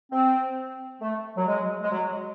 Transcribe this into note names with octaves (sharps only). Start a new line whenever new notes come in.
C4
A3
F#3
G#3
G#3
F#3